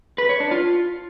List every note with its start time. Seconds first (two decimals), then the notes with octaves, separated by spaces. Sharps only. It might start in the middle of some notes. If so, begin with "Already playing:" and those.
0.18 B4
0.29 C#5
0.40 D4
0.51 F4